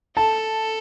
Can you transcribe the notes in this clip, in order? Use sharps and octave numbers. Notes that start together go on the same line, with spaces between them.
A4 A5